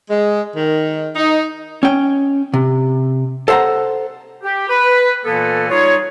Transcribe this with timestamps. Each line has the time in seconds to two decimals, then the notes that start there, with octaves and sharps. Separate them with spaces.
0.10 G#3
0.56 D#3
1.16 D#4
1.83 C#4 G5
2.54 C3
3.48 A4 C5 E5 F#5 A#5
4.43 G4
4.69 B4
5.24 A#2 E3 A#3 B3 A4
5.69 G3 D#4 F4 G#4 C#5